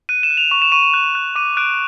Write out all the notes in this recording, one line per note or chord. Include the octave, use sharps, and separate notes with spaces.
F#6 D#7
E7
F#6
F7
C#6 F7
E7
C#6 D#7
E7
F#6
F#6
D6 D#7
F#6 D7